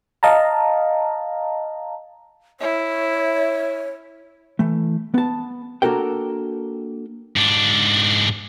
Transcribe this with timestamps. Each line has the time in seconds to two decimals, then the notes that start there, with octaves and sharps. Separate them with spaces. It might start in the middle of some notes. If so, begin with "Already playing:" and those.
0.23 D#5 F5 A5 A#5
2.61 E4 C#5
4.59 E3 A3
5.14 B3 A5
5.82 A#3 D4 F#4 A4 A#4 G5
7.36 G#2 D4